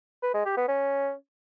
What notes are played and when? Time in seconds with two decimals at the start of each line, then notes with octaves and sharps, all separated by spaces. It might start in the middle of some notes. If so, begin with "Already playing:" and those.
0.23 B4
0.34 G#3
0.45 G4
0.57 B3
0.68 C#4